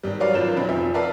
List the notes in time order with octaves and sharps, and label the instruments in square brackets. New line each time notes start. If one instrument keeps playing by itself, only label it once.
[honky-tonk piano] G#1 G3
F#3 A#4 B4 C#5 D5 F5
G#1 F#2 F3 B4 A6 E7
F1 B1 C4 B5
F1 F3 E5
A#4 B4 D5 E5 F5 A5